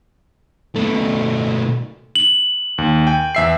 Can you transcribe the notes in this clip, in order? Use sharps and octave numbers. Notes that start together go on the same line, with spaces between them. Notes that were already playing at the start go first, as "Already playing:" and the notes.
B2 A3
F#7
D#2
G5 G#5
E2 E5 C7